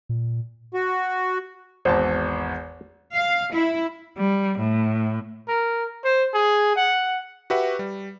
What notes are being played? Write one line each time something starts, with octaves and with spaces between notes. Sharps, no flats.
A#2
F#4
G#1 E2 C5 A5
F5
E4
G3
A2
A#4
C5
G#4
F#5
F#4 G4 B4 E5 F#5
G3